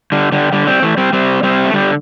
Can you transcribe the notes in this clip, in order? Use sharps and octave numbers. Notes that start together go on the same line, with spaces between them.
D3 G3
D3 G3
D3 G3
G3 C4
E3 A3
G3 C4
G3 C4
G3 C4
A3
D3 G3